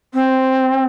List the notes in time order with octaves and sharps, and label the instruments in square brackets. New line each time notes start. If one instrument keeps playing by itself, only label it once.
[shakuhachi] C4